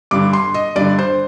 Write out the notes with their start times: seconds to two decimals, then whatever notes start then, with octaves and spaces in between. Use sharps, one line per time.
0.11 G2 D3 D6
0.33 C6
0.54 D#5
0.76 G2 D3 D5
0.99 C5